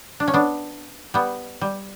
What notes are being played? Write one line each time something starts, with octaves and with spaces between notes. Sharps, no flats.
D4
C#4
B3 D4
G3 B3
G3